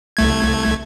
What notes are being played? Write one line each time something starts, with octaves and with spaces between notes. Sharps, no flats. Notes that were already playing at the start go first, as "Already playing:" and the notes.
C2 A3 G#6